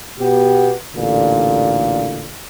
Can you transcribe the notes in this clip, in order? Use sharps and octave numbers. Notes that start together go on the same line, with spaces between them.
B2 B3 G4
A1 A#2 D3